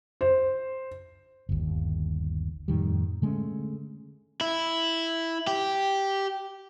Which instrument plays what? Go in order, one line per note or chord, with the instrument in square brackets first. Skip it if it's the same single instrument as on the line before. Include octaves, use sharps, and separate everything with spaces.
[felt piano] C5
[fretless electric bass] G1 D#2
F2 A2 D#3 G3
D3 G#3 A3 C#4
[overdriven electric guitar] E4
G4